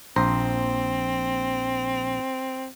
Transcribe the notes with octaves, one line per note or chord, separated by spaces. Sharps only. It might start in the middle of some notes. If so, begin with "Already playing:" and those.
A#1 C4 C5 A#5